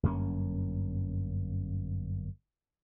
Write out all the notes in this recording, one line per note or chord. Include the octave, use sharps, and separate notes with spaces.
G1 F#2 A#3 C#4